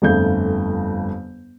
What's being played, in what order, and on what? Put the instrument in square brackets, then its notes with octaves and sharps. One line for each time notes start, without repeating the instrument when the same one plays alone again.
[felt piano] G1 F2 A3 G6